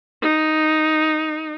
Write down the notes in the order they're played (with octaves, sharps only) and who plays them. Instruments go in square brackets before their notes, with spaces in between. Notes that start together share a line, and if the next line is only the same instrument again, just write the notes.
[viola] D#4